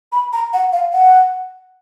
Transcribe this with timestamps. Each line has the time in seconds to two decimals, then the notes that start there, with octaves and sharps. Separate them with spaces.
0.12 B5
0.33 A#5
0.53 F#5
0.72 F5
0.93 F#5